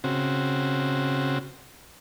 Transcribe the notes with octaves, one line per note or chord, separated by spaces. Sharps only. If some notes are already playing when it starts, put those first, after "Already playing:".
C#3 C4 F#4